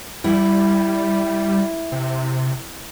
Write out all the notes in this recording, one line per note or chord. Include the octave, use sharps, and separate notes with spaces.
G3 E4
C3